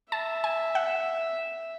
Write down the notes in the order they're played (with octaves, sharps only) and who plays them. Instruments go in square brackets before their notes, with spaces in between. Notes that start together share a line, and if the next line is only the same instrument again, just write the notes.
[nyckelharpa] E5 [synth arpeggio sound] A5
[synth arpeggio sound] G#5
F#5